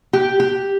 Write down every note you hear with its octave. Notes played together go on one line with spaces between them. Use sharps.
G4
G4